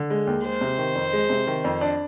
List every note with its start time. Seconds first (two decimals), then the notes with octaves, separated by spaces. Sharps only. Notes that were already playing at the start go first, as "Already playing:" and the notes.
Already playing: D3
0.10 G#3
0.27 D#2
0.44 G#3 C5
0.61 C3
0.78 D#3
0.95 F2
1.13 G#3
1.30 C3
1.47 D#3
1.64 F2
1.81 D4